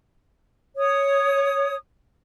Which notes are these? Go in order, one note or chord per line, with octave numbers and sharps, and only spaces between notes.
C#5 D#6